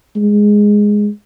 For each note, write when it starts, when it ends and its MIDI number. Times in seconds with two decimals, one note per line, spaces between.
0.16 1.09 56